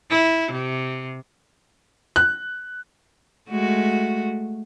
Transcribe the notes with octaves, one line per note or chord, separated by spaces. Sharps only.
E4
C3
F#6
G#3 A3 F#4